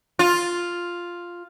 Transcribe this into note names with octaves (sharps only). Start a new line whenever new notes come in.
F4